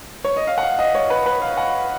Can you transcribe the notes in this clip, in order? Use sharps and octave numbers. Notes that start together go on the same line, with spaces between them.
C#5
D#5
F5
F#5
F5
D#5
C#5
B4
B4
F5
F#5